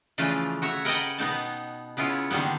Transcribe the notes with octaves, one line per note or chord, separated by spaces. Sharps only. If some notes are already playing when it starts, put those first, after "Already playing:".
C#3 E3 F3 A3 D4 F4
F#4 C#5 E5
A#4 B4 D#5 F#5 G5 A5
B2 B3 D#4 A5
C#3 B3 E4 F4 C#5
D3 D#3 G3 A#3 B3